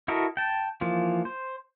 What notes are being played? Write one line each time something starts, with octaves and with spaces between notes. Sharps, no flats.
E4 F#4 A4 A#4 D#5
G5 A5
E3 F3 A#3 F4
C5